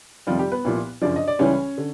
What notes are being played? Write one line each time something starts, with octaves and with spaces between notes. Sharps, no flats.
F2 C3 D#3 F3 G3 F4
G3 G4
B3 B4
C2 A#2 F3
F#2 C#3 F3 D4 D5
D#5
D5
C#2 C#3 E3 G3 C#4 C#5
D3